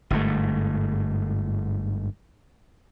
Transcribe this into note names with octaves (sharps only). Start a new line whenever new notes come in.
G1 G#2 A3